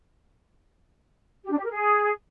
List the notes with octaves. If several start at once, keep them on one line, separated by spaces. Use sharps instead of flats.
G4
D4
G4
A#4
G#4